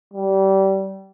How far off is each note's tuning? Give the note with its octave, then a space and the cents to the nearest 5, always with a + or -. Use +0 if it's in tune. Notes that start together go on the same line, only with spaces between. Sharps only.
G3 -25